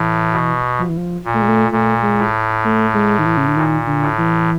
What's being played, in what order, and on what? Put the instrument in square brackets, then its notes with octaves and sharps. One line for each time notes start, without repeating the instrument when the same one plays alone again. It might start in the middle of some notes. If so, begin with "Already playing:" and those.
Already playing: [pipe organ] A2 [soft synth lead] E3
[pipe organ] B2
[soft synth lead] F3
E3
F3
[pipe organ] A#2
[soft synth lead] A3
G#3
A3
[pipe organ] A#2 [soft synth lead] A3
[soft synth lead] G#3
[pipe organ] A2
[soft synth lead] A3
G#3
D#3
E3
C#3
D3
[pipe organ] A#2 [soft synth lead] D#3
[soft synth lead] D3
[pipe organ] A2
[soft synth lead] E3